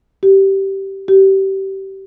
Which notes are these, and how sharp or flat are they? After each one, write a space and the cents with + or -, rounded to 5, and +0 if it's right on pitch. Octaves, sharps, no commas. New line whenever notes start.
G4 -15
G4 -25